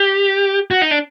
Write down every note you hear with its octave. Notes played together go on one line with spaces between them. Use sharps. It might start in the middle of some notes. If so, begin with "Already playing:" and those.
Already playing: G4
F#4
D#4
D4